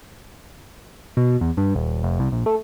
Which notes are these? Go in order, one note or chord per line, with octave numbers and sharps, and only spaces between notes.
B2
E2
G2
D#1
F1
C2
A#1
A3